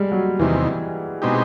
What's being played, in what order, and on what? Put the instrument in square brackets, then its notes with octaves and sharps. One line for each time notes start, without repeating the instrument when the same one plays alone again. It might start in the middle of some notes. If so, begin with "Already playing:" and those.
Already playing: [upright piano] G3 G#3
F#3
[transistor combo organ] E2 C3 D#3 [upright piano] E3
[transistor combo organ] B2 G#3 C4 D#4 G4